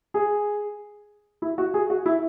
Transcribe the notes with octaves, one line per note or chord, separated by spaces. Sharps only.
G#4
E4
F#4
G#4
F#4
E4